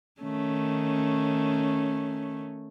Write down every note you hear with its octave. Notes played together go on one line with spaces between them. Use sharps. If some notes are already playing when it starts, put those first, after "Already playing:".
D#3 A3 C#4